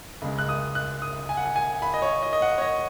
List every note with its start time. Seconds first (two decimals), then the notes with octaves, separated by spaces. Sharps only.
0.22 C#2 C#3 G#3
0.39 F#6
0.49 D#6
0.75 F#6
1.02 D#6
1.29 G#5
1.37 F#5
1.46 G#5
1.56 G#5
1.82 B5
1.94 D#5
2.02 C#5
2.23 D#5
2.33 D#5
2.42 F#5
2.58 C#5
2.62 D#5